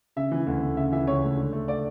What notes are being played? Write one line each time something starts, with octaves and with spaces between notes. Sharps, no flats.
C#3 E5
E3
D2
D2
C#3 E5
E3 E5
C#2 C#5
A3
D3
A3
D5